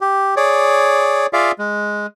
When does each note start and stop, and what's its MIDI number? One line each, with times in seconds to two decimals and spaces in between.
0.01 0.34 67
0.36 1.26 68
0.36 1.26 73
0.36 1.26 74
1.33 1.52 65
1.33 1.52 68
1.33 1.52 74
1.33 1.52 76
1.33 1.52 77
1.59 2.06 56